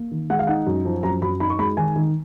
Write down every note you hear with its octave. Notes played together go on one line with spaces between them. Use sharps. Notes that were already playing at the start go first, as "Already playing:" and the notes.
Already playing: A#3
D#3
G#3 F#5
F5
D#4 F#5
F#2
F3
F#2 A#5
F#2 B5
D#4 B5
C#6
G#3 B5
D#3 G#5
D#3